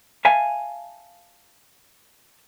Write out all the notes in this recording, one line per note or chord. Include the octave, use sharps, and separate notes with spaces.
E5 F5 G#5 A5